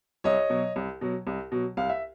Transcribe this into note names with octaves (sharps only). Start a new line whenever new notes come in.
C2 C#5 D#5
B2 F#3
C2
B2 F#3
C2
B2 F#3
C2 F5
E5